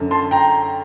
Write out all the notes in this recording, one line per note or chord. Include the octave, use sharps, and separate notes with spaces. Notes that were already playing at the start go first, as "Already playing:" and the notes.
Already playing: F#2 D3
A5 C6
G5 A#5